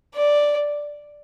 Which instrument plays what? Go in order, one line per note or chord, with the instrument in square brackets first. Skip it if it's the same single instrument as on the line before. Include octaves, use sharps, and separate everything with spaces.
[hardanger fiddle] D5